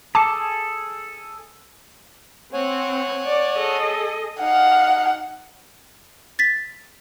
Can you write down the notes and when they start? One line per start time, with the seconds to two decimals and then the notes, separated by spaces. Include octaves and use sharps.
0.15 G#4 A4 A5 D6
2.53 C4 C#5 F#5 G#5
3.27 D5
3.57 G#4 A4 D#5
4.41 D#4 F5 F#5
6.39 A6 B6